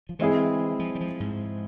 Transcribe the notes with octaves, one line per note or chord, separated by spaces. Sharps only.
F3
E3 G#3 C4 E4 G#4
F3
G3
F3
G#2